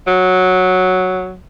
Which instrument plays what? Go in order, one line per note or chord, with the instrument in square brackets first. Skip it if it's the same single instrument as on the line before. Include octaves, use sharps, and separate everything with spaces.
[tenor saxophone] F#3